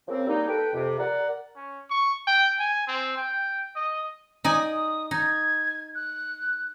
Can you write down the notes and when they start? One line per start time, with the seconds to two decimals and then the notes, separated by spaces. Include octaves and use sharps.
0.08 C#3 F3 A#3 C4
0.27 G3 A#3 D#4
0.48 A4 B4 G5
0.73 F2 C3
0.98 A#4 D5 F#5
1.55 C#4
1.90 C#6
2.27 G5
2.59 G#5
2.87 C4
3.17 G5
3.76 D#5
4.45 D#4 D5 G#5 D#6
5.11 D#4 G#6
5.95 F#6